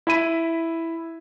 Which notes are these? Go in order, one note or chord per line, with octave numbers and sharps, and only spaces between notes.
E4 E5 B5 D#7